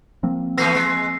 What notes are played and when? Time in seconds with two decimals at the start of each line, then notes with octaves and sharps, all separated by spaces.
0.23 F3 A#3 C4
0.58 E3 A3 B3 E6 A#6 C7
0.75 G#3